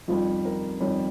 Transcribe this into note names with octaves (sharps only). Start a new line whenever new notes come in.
F2 D#3 G3 F4
A#4
F2 D#3 G3 C#5